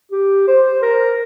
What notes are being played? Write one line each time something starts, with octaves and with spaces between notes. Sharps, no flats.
G4
C5
A#4